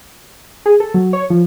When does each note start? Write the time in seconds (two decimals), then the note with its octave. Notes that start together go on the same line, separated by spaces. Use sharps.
0.66 G#4
0.80 A4
0.94 F#3
1.13 C#5
1.30 F3